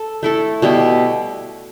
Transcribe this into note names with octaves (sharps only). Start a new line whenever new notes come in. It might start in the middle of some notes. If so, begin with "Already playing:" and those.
Already playing: A4
A3 E4 A4
B2 G3 B3 E4